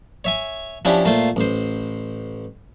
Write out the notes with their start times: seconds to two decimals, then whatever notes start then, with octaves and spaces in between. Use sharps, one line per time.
0.24 C#5 E5 G#5
0.85 F3 C#4 D4 E4 G4
1.05 A#2 A3 F4 C5 C6
1.36 A1 C5